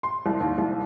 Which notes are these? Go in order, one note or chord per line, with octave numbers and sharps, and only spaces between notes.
C6
C2
D#2
C2